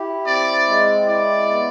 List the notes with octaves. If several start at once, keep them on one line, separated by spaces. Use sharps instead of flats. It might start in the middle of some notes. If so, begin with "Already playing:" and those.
Already playing: E4 G4
C4 D5
G#3
E4 D5
B3